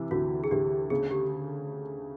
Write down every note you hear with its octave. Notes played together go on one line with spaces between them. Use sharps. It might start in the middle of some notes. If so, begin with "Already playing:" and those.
Already playing: C3 E3
D2 F#4
G#4
D2 G4
C#3 G#4
G4